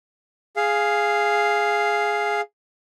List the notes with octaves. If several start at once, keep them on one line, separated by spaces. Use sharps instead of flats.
G#4 F5